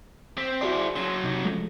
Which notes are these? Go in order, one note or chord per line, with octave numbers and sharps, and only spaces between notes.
C4 B6
E4 F#4 G#4 C5 D5
C#3 F#3 C6
C3 D#4
F3 G#3 A3